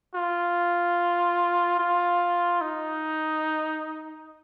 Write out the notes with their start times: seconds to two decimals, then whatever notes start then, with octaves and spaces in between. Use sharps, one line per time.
0.14 F4
1.79 F4
2.61 D#4